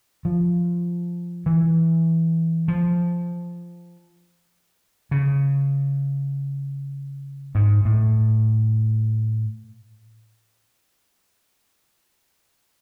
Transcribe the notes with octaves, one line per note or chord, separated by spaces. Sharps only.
F3
E3
F3
C#3
G#2
A2